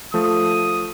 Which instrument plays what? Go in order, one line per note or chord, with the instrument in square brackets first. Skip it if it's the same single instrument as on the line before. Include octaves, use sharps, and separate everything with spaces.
[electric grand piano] F3 A3 [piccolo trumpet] D#6